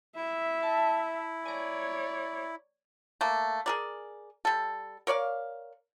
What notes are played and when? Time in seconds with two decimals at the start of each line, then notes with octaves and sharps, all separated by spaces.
0.16 E4 E5
0.63 A5
1.45 C#5 D5 G#5 A#5
3.21 A3 A#3
3.66 G#4 A#4 D5
4.45 G3 A4
5.07 A#4 C#5 D5 F5